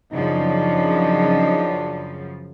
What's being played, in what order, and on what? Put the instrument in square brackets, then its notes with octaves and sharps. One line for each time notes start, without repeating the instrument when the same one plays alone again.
[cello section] F#2 C#3 F3 [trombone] D4 [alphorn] D#4